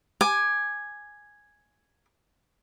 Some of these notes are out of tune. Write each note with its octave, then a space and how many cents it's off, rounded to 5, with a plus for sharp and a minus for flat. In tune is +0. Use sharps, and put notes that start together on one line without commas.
G#5 +0 D6 +25